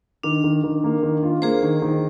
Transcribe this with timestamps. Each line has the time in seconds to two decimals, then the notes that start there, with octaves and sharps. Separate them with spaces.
0.23 D#3 D4
0.44 D#3
0.64 D#3
0.84 A#3
1.03 D#3
1.23 F4
1.42 A#3 G#4 C5
1.62 D#3
1.82 D#3